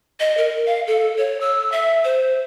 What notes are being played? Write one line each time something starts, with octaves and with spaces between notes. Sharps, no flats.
D#5
A#4
F5
A4
C#5
E6
E5
C5